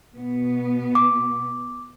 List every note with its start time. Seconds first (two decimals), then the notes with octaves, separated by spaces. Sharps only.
0.16 B2 B3
0.95 D6